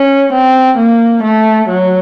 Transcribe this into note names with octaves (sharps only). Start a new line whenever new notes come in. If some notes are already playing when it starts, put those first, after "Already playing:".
Already playing: C#4
C4
A#3
A3
F#3